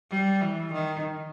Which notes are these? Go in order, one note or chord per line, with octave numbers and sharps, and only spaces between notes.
G3
E3
D#3